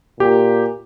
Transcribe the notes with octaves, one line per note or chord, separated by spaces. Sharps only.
A#2 G4